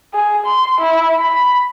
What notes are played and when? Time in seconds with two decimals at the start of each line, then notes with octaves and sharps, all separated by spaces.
0.14 G#4
0.46 C6
0.81 E4
1.19 B5